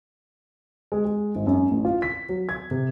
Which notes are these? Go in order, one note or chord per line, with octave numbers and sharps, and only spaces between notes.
G#3
G#3
G#1
F#2
A1
F4
B6
F#3
G#6
C3